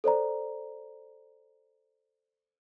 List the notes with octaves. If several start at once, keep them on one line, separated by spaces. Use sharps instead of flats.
A4 C5 D5 A#5